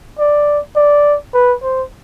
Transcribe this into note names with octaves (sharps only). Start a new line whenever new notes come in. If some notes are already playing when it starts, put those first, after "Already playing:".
D5
D5
B4
C5